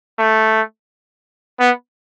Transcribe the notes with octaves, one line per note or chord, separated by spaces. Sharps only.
A3
B3